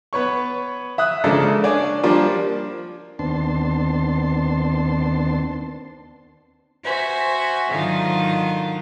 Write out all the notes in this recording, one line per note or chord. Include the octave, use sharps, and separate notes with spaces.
B3 B4 C#5 C#6
E5 D#6 F#6
C#3 F3 G#3 A#3 D4 A4
D4 C#5 D5 G#5
F3 G3 A#3 D4 F4
D#2 B3 C4 D4 A5 C6
F#4 C5 E5 G#5
G#2 D3 D#3 F#3 D#4 F4